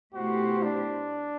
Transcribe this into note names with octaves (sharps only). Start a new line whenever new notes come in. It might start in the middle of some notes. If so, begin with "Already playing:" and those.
B2 A3 E4 F#4 G4 C5
D4